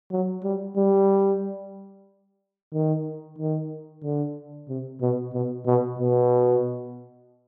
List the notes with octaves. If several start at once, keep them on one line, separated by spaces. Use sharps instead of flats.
F#3
G3
G3
D#3
D#3
D3
C3
B2
B2
B2
B2